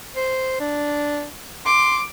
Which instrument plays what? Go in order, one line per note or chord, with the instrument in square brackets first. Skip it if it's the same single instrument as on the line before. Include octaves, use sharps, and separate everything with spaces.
[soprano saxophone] C5
D4
[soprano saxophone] C6 [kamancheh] D6